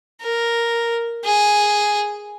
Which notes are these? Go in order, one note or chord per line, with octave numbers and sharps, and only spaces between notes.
A#4
G#4